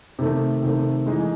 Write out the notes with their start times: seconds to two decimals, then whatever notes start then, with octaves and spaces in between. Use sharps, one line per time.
0.19 C3 D#3 A3
0.63 C3 D#3 A3
1.07 E3 G#3 D#4